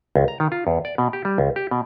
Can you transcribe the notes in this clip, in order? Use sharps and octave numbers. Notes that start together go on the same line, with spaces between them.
C#2
A#5
D#3
F4
E2
D5
B2
G4
G3
C#2
G4
B2